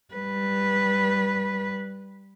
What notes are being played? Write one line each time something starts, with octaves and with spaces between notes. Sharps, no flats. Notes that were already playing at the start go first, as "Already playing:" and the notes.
G3 B4